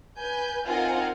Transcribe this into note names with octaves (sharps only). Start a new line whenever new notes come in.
B4 G#5 G6
C4 D#4 F4 A#4 F#5 G#5